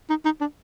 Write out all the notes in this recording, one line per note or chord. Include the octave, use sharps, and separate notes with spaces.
D#4
D#4
D4